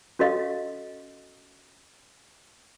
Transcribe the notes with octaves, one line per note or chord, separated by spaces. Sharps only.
C#4 F#4 A4 D#5 F5